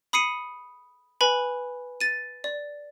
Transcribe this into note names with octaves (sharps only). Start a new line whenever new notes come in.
B5 D#6 C7 C#7 D#7
B4 G#5 B5
A6 D#7
D5